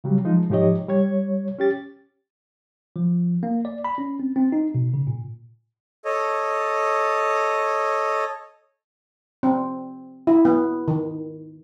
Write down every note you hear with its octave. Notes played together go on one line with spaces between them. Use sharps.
C#3 F#3 G3
F3 G#3 D#4
G#2 F3 D#4 G4 C#5 D#5
G3 C#5 G#6
C#4 G4 A6
F3
A#3
D5
B5
C#4
C4
C4
D#4
B2
C#3
A#2
A4 C#5 D#5
C4
E4
B3
D#3